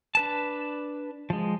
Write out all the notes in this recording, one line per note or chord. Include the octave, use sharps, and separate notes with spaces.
D4 B4 A5
F3 G#3